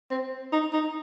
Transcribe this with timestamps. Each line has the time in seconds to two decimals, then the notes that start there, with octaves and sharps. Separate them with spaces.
0.11 C4
0.53 D#4
0.73 D#4